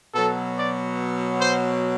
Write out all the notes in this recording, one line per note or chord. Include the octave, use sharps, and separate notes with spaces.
B2 F#3 A4
D5
C5